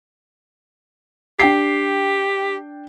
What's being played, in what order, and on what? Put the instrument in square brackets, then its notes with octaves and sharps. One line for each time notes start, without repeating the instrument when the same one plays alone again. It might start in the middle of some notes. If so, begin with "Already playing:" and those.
[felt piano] D4 G5 C7 [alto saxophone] G4